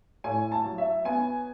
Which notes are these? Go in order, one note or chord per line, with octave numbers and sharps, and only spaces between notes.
A2 G#5
A5
F#3
E5
B3 G#5